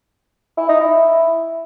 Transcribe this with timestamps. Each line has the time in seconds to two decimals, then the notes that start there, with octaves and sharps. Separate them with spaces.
0.57 E4
0.69 D#4
0.81 E4